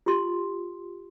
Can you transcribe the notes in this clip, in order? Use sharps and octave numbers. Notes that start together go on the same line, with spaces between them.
F4 G4 C6